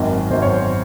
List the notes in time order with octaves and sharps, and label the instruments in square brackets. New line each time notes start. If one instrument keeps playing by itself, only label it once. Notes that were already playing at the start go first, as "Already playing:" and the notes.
Already playing: [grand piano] G#1 F#2 D#3
G#1 F#2 D#3 C5
C#5
C5